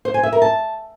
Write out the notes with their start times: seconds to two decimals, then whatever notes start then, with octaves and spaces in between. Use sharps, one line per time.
0.05 C5
0.14 G#5
0.23 E5
0.33 A#4
0.42 A5